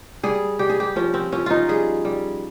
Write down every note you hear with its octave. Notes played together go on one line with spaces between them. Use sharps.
G3 G#4
G3 G4
G#4
G4
F3 C#4
C4
F3 C#4
D#4 F4
G3 G#4
G3